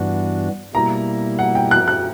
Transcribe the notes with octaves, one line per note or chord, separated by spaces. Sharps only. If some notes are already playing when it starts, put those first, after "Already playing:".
Already playing: G2 E3 B3 D4 F#4
B2 G3 A#3 E4 A#5
F#5
G5
F#6
F#6